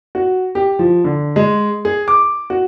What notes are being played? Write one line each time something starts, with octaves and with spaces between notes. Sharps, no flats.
F#4
G4
F3
D3
G#3
G#4
D6
F#4